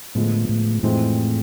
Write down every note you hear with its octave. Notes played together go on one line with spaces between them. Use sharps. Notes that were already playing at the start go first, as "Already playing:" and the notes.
A2 D3 F3 G#3 B3
A2
F2 A2 E3 G#3 C4 F4